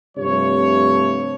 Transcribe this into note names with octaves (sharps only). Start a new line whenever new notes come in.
G2 C3 F3 A3 C#5